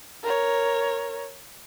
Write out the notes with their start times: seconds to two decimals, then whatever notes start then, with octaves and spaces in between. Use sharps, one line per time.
0.23 A#4 C#5